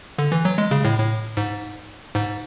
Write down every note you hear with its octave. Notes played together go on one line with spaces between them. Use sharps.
D3
E3
F#3
G#3
C#3
A2
A2
G#2
G#2